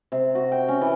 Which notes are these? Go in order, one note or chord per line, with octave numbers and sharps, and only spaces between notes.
C3
F#4
G5
C#4
E3